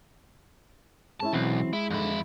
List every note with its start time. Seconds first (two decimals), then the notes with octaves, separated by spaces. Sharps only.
1.20 G#3 C#4 E4 A5
1.33 B1 E3 F#3 C4
1.73 G#3 E4
1.91 F2 D3 D#4 E4